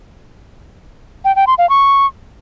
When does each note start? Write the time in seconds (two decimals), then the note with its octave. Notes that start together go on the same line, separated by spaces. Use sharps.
1.25 G5
1.36 G5
1.47 C6
1.58 F5
1.69 C#6